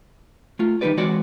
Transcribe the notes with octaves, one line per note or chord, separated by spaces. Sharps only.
A3 F4
D#3 G3 D#4 G4 B4 D5
E3 G#3 C4 F#4 C#5 D5